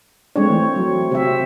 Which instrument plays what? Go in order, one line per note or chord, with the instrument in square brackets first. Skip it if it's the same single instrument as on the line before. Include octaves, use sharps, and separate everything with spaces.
[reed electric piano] G#3 D4 [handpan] A3 C4 C#5
[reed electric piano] E3
[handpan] F#3
[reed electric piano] C3 F#4 [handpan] C4 E5